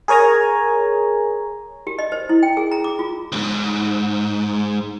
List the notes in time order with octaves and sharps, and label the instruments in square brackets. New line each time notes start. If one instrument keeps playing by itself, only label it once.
[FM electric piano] G#4 A#4 C#5 G#5 A#5
[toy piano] G4
D#5
C5
E4
G5
G#4
A#5
D6
F4
[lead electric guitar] D#2 G#2